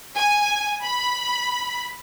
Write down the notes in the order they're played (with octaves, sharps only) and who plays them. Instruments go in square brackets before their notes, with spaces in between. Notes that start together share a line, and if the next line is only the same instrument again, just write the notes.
[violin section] G#5
B5